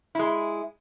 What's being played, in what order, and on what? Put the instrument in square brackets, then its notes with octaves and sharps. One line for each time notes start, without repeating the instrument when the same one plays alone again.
[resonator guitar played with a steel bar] G#3 E4